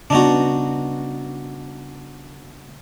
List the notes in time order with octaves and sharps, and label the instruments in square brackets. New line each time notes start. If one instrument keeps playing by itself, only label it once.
[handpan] C#3 G3 B3 [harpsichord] D4 D#4 F#4